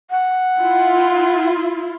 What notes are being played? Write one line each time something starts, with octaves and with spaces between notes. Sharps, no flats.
F#5
E4 F4